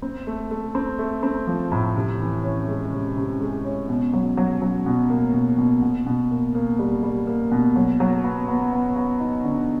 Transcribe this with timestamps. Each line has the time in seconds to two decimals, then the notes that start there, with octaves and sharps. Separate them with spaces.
0.02 C4
0.27 A3
0.51 A3
0.75 C4
0.99 A3
1.23 C4
1.47 F3
1.72 A2
1.96 C3
2.20 E3
2.44 C#4
2.68 G#3
2.93 C3
3.17 C3
3.40 G#3
3.65 C#4
3.89 B2
4.13 F#3
4.37 F#3
4.62 F#3
4.86 B2
5.10 A#3
5.34 B2
5.58 B2
5.82 B2
6.06 B2
6.31 A#3
6.55 A#3
6.79 G3
7.03 G3
7.27 A#3
7.51 B2
7.76 F#3
8.00 F#3
8.24 B3
8.48 B3
8.73 B3
8.96 B3
9.20 D#4
9.45 D3